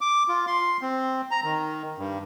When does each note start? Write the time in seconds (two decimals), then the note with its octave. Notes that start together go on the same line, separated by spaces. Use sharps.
0.01 D6
0.29 F4
0.47 C6
0.81 C4
1.31 A#5
1.44 D#3
1.98 G2